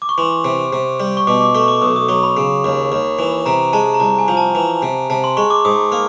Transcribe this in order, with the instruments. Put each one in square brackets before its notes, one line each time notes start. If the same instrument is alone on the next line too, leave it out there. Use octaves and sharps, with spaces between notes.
[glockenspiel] D6
C#6
[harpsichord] E3 [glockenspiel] C6
[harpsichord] C3
C3
G3
[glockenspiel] C#6
[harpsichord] B2 [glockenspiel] D6
[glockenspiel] D6
[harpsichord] A3 [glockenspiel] C#6
[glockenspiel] D6
[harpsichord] B1 [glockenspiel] D#6
[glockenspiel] D#6
[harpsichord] F#3 [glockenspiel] C#6
[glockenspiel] B5
[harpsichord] C#3
D#2
D#2
E3
[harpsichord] C3 [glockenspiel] A#5
[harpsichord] G#3 [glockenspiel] A5
[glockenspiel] A#5
[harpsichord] C2 [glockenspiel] A5
[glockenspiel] G#5
[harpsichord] F3
[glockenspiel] A5
[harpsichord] E3
C3
[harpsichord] C3 [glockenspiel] A5
[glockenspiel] C6
[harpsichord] G#3 [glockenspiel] C#6
[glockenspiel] D6
[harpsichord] G#2 [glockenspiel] D#6
[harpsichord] A#3